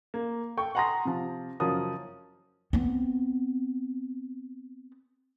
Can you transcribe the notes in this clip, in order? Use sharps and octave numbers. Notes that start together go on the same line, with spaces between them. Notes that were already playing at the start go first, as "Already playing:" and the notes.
A#3
A4 G5 C#6
F#5 G#5 A#5 C6 D#6 A#6
C3 F3
F#1 F3 F#3 C#4 A#4 D#6
B3 C4